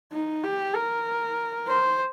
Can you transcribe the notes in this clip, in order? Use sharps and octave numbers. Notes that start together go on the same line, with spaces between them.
D#4
G4
A#4
C5